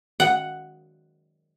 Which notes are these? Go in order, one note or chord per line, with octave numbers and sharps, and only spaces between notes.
F#5